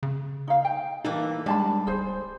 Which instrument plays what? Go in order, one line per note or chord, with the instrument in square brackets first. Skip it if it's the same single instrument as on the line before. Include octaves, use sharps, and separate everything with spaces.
[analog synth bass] C#3
[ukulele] D#4 F5
G5
[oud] E3 A#3 A4 [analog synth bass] D#4
[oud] G3 [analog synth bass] G#3 [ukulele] D4 A5 B5
[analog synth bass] D1 [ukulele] G#4 C5